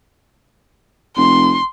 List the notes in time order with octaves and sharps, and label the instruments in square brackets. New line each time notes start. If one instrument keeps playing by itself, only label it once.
[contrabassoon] F1 [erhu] C6